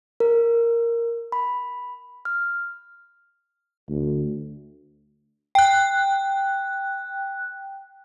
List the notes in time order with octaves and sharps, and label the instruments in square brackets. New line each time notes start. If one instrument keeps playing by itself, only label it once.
[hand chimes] A#4
B5
F6
[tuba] D2
[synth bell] G5 F#6